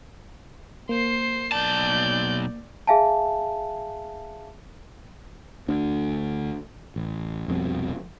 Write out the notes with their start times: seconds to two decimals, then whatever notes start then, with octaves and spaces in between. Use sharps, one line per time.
0.89 A#3 C5 C7
1.52 B1 D5 A5 G6
2.87 G#4 E5 F5 G#5 A5
5.68 D2 D3
6.96 A1
7.48 F1 C2 F2 B2